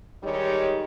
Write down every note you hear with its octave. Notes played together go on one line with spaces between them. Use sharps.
D#3 G3 G#3 D#4 G4 C#5